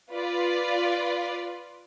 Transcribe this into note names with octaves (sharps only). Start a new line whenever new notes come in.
F4 B4 D5